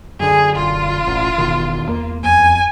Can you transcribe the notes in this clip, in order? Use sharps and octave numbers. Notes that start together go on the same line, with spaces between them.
F#2 D3 G#4
E1 F4
A1
E2 B2 D#3
E2 A#3
F2 G#5